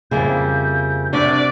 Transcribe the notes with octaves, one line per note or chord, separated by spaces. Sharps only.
F2 G#2 C#3 G3 A#3 E4 G6
C3 D4 F#4 D5 B5